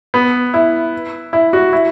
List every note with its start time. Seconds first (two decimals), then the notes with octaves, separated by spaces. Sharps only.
0.14 B3
0.54 E4
1.33 E4
1.53 F#4
1.73 E4